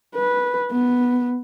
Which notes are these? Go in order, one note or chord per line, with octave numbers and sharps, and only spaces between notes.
B4
B3